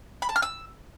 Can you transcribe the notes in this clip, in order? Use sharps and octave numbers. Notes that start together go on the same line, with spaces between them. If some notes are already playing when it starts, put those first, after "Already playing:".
B5
A5
F6
E6